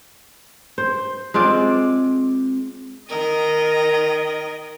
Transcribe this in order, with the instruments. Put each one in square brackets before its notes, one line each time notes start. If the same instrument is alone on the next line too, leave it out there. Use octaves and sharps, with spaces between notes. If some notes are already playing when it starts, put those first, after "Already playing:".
[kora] C5
G#3 C4 F4 D5
[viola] D#3 D#5 [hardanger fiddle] A#4